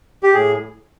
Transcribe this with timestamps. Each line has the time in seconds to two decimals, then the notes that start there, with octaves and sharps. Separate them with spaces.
0.23 G4
0.34 A2 G#4